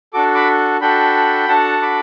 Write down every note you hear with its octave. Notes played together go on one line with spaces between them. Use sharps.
D4 F#4 A4 D6
B5 D6
D4 F#4 A4 G5 B5
D4 F#4 A4 F#5 A5
B5 D6